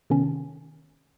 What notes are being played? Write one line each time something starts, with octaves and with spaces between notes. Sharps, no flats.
C3 D#3 B3 C#4 A5